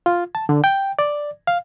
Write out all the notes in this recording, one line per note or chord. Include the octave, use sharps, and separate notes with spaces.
F4
A5
D3
G5
D5
F5